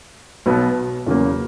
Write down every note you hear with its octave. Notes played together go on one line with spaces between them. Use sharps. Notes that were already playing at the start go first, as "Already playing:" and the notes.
B1 B2 F#3 B3
E2 C#3 F#3 A#3